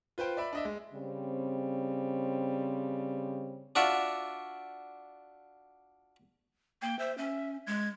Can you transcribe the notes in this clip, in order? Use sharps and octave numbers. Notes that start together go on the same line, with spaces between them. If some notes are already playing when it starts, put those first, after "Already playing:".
F4 B4 C5 G5
D5 E5 B5
D4 D#5 E5
G#3
C#3 G3 C4
D4 F4 F#4 D5 E5
A#3 G5
C5 E5
C#4 E5
G#3 G#6